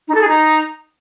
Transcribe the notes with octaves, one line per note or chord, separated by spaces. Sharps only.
D#4
A4
G#4
D#4